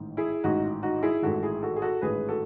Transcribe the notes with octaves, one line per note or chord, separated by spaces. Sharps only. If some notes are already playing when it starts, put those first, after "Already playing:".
Already playing: A1 G#2 D#3
E4 G#4
A1 G#2 D#3 D#4 F#4
D#4 F#4
E4 G#4
A1 G#2 D#3 F#4 A4
E4 G#4
F#4 A4
G#4
F#4 A4
A1 G#2 D#3 G#4 B4
F#4 A4